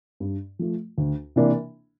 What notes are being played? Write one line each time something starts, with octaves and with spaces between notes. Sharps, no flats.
G2
F3 A3
D2
C3 E3 A#3 D4